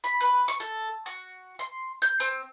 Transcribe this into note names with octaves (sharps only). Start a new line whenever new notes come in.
B5
B4
C#6
A4
F#4
C6
G6
C4